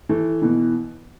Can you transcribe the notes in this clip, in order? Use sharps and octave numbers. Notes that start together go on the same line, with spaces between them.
E3 A3
B2 E3